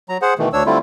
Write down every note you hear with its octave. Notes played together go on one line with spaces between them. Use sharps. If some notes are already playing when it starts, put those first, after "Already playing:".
F#3 A#5
G#4 C5 F#5
B2 D#3 E3 A3
D2 D4 C#5 E6
D3 G3 A3 C4 E4 F4